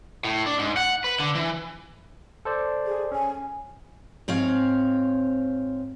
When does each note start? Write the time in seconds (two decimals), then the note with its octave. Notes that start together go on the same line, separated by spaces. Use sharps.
0.25 A2
0.46 D4
0.59 G#2
0.77 F#5
1.04 B4
1.20 D3
1.35 E3
2.45 A4 C5 D5
2.86 G#4
3.12 C#4 G#5
4.28 G#2 C4 C#5 F5